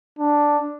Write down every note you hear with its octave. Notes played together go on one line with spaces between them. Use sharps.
D4